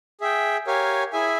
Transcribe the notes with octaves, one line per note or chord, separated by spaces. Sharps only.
G#4 E5 G5
G4 A#4 C#5 F5 G#5
E4 G#4 E5 G#5